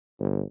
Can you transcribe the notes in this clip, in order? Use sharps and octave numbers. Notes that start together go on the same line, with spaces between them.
G1